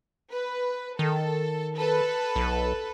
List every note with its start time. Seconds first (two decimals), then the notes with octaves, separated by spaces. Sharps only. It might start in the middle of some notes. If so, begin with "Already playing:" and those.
0.31 B4
0.99 D#3 A4
1.76 A4 B4
2.36 B1